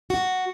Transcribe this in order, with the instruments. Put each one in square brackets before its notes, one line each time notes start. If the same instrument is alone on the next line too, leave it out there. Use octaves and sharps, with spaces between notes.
[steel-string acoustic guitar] F#4